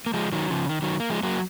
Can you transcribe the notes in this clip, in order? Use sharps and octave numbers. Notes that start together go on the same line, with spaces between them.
A#3
F3 G#3
D#3 F#3
C#3 F3
D#3
D#3 F#3
A#3
F3 G#3
F#3 A#3